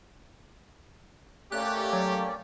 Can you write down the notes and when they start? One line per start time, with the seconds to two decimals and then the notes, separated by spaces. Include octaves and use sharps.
1.52 A3 A#3 C#4 G4 D5 F#6
1.93 F#3